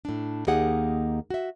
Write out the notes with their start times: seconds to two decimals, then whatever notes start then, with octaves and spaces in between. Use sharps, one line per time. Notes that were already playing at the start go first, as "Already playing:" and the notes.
0.05 A2 D4
0.47 D#2 A#3 D#4 G4 G#4 F#5
1.30 F#4 E5